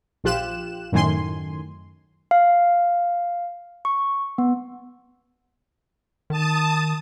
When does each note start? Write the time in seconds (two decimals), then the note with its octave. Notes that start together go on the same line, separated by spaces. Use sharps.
0.24 A#1 F3 F4 G4 F#6 E7
0.92 F#2 A2 D#3 G#5 C6
2.31 F5
3.85 C#6
4.38 B3
6.30 D#3 A5 D#6